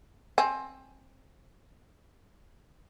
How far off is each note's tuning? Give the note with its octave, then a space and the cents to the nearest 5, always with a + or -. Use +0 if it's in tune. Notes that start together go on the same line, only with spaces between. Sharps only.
C4 +20 G#5 +15